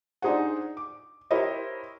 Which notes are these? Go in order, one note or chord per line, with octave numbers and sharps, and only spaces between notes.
D4 D#4 G#4 C5 F#5
D6
E4 G4 A#4 C5 C#5 D#5